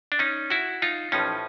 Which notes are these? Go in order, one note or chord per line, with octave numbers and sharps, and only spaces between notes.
D4
C#4 D#4
E4 F#4
D#4 F4
A1 A2 F3 C#4 D#4